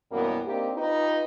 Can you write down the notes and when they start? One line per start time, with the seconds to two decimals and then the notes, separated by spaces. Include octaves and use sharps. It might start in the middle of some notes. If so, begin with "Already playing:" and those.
0.12 F#2 B2 E3 G3 A#3 B3
0.46 A#3 C4 D4 D#4 G4
0.78 D#4 F4 G4 B4